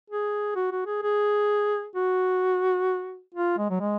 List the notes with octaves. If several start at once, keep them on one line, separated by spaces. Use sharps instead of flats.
G#4
F#4
F#4
G#4
G#4
F#4
F4
G#3
F#3
G#3